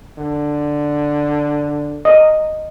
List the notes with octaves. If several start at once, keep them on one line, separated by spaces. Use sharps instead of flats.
D3
D#5